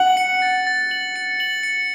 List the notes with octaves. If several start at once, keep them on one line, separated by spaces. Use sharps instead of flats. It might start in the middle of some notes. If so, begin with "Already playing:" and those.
Already playing: F#5 F#7
C#7
A6
A6
F#7
C#7
F#7
C#7